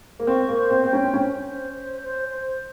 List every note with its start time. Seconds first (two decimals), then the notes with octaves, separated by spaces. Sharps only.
0.19 A#3
0.27 C4 C#6
0.49 A#3
0.57 C5
0.70 C4
0.84 C4 G5
0.93 C#4
1.05 C4
1.14 C#4 C5
1.43 C5
1.72 C5
2.01 C5
2.29 C5